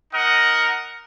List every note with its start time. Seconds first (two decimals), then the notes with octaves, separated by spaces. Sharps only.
0.13 D#4 A#4 D#5 F#5